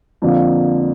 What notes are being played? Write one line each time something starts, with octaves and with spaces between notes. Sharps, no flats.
F2 D3 F3 A#3